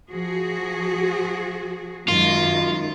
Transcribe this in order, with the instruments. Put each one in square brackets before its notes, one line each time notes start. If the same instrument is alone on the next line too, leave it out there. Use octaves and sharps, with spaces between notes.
[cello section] F3 F#4 G#4
[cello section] F#2 D#3 G#3 [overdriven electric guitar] F4